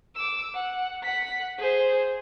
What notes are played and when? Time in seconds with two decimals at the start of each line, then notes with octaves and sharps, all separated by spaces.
0.15 D6 E6
0.54 F#5
1.03 F#5 B6
1.59 G#4 C5